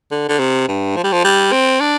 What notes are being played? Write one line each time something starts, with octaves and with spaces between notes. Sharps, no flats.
D3
D3
C3
G2
F3
G3
F3
G3
C4
D4